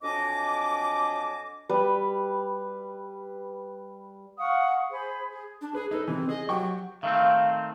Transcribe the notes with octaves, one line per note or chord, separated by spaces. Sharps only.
F2 F#3 D4 D#5 G#5 D6
G3 B4
F5 F#5 C#6 D#6
G#4 C5 B5
G#4
D4
G#4 B4
D#4 A4 B4
C3 E3 C4
G#4 D#5
F#3 G4 G5 C#6
D#3 A3 C4 F5